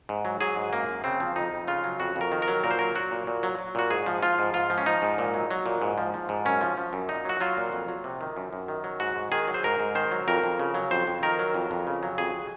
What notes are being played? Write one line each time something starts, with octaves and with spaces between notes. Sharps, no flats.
G#2
F#3
F#3 G#4
G#2
F#2 A#3
F#2
C#3 C4
F3
F2 D#4
F2
C#3 F4
F#3
F2 F#4
F2 A#4
D#3
A#4
F#3
A#2 A#4
C5
F#3 A#4
F#3 F#4
A#2
A#2
F#3
F#3
A#2 F#4
G#2 G#4
F3
F3 F4
G#2
G#2 F4
F3
C#4
F3 D#4
G#2
A#2
F#3
F#3
A#2
G#2
F3
F3
G#2
F#2 C#4
F3
F3
F#2
A#2 D#4
F#3 F#4
F#3 F4
A#2
F2
F#3
C3
D#3
F#2
F#2
D#3
F#3
G#2 F#4
G#2
D#3 G#4
F#3
C5
G#2 A#4
G#2
D#3 C5
F#3
F2 A#4
F2
C#3
F#3
F2 C5
F2
D#3 A#4
F#3
F2
F2
C#3
F#3
F2 G#4